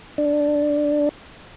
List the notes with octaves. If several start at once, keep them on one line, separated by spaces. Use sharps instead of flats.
D4